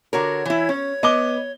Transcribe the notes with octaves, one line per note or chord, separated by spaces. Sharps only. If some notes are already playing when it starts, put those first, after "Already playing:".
D3 F#4 A#4 C#5
E3 E4
C#4
B3 D#5 D6 G7